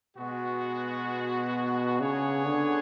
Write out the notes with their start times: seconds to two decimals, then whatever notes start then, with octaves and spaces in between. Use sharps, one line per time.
0.17 B2 G#3 B3 F#4
2.00 C#3 B3 D4 G#4 C#5 F#5
2.46 D3